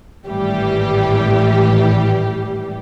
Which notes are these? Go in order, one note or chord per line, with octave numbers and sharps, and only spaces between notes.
G#1 A2 E3 G3 G4